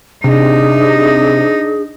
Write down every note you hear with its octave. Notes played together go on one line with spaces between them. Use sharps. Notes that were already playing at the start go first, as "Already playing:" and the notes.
C3 D4 D#4 G#4